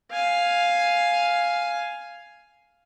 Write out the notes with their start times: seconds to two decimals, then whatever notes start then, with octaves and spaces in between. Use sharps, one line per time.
0.11 F5 G#5